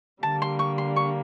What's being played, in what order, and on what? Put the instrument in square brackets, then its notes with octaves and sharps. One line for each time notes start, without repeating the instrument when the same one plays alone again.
[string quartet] D3 G3 A#3 [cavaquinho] A5
[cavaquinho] C6
C#6
C6
C#6